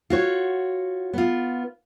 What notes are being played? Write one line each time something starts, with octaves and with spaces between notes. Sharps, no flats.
F4 F#4 C#5
B3 F4